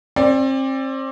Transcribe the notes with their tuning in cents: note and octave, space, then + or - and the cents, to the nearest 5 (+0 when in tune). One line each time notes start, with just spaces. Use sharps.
C4 +35 D5 +0